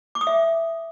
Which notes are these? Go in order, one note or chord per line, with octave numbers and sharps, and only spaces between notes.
D6
D#6
E5